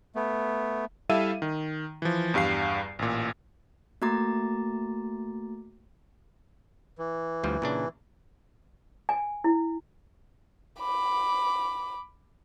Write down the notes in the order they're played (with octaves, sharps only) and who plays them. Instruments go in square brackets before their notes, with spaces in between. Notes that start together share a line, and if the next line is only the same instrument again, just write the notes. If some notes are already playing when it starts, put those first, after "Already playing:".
[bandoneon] A3 B3
[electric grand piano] G3 E4 A4 E5 F5 D#7
D#3
E3 F3
E2 G2 G3 F5 C7
A1 A#2
[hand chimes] A3 A#3 F#4 A#5 D6 A6
[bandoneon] E3
[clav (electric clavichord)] D2 F3 G3
A#2 C#3 D4
[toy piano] G#5
E4
[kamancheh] B5 D6